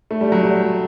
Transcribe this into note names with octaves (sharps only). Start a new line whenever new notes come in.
A3
G3
F#3
G3